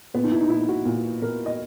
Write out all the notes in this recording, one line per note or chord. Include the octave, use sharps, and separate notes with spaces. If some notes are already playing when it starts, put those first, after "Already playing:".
A#2 B3
D#4
E4
D#4
A#2 E4
F#4
A#2
A#2 A#4
D#5